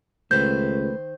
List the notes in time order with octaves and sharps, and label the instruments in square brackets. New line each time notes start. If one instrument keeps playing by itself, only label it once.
[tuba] C#2 [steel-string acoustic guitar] D#3 C5 [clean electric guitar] A3 A4 B4 [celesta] G6